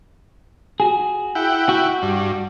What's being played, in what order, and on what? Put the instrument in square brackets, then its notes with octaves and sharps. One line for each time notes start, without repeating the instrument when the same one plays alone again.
[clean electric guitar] F#4 G#4
[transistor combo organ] E4 F#5 G5
[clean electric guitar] F#4
[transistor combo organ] G2